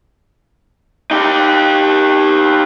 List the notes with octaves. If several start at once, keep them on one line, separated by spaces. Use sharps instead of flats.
D#4 G4